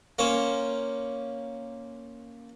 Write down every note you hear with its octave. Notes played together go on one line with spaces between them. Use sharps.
A#3 C#4 C5